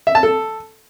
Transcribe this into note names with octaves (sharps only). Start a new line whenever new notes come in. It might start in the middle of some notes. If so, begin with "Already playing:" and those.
E5
A5
A4